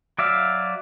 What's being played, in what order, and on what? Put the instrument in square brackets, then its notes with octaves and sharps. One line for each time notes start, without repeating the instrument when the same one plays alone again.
[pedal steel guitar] F#3 D5 E5 F5